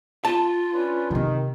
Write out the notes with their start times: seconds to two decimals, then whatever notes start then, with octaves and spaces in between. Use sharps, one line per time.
0.25 F4 A5
0.73 C#4 D4 B4
1.11 C3 D#3 C4